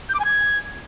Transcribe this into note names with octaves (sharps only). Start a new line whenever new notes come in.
G6
D6
G#5
G#6